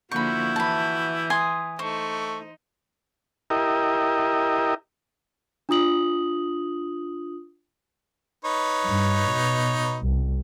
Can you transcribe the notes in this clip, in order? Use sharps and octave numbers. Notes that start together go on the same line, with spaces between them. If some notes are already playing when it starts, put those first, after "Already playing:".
D3 F3 A#3 E4 F#4 B5 C#6 G6
E3 A5 B5
G#5 C6 D#6
A3 D#4 C5 C#6
E4 G4 A#4 D#5
D4 F4 D#6 F#7
D#4 B4 C#5
G2
B2
C2